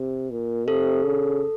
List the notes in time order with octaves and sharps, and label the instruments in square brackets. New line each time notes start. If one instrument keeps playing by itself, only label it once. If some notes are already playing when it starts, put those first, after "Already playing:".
Already playing: [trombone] C3
A#2
[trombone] C3 [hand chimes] A4
[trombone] C#3